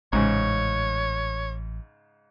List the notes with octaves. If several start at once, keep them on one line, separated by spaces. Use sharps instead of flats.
A1 G#2 C#3 C#5